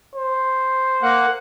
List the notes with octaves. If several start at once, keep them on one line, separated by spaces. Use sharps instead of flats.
C5
A#3 F#5